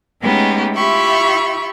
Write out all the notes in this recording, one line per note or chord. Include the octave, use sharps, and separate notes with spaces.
G#3 A3 B3 C#4 D#4 G4
E4 F4 G4 E5 B5 C#6